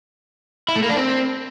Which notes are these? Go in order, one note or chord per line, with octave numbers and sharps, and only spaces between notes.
E4
A3
A#3
D4
C4